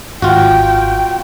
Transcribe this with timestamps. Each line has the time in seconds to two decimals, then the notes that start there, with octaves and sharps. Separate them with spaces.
0.22 G#1 F4 F#4 G5